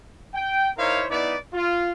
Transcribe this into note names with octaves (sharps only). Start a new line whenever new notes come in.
G5
D#4 E4 A#4 C5 C#5 F5
B3 D#4 E4 B4 D5
F4